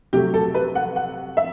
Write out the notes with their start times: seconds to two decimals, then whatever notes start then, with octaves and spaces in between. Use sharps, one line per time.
0.13 C3 F#3 A3 G4
0.34 A4
0.54 B4
0.75 F#5
0.96 F#5
1.37 E5